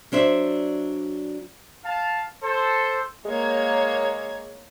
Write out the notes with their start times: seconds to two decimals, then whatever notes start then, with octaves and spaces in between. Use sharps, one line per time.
0.12 F#3 D4 C5 E5
1.85 F5 A5
2.43 A4 C5
3.25 G#3 A#3 C#5 G#6